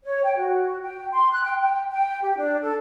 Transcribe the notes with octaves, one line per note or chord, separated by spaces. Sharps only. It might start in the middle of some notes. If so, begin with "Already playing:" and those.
C#5
G5
F#4
G5
C6
F#6
G5
G5
G5
G4
D4
A4